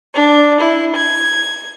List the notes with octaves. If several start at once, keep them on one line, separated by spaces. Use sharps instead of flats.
D4
E4
G#6